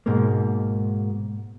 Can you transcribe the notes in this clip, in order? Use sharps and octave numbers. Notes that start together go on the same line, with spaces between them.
G#2 B2 G#3 A#3